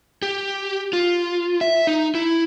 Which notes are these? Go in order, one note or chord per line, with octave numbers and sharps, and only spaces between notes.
G4
F4
E5
D#4
E4